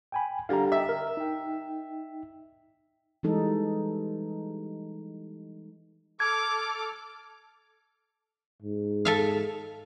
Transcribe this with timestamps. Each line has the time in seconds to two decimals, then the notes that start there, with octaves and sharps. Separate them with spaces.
0.12 G5 G#5 B5
0.49 D3 G3 F5 A#5
0.72 D#5 E5 G5
0.89 A#4
1.17 D#4 G5
3.23 E3 G3 G#3 D#4 A4
6.20 A4 D6 F6 G#6
8.62 G#2
9.05 A4 E5 F5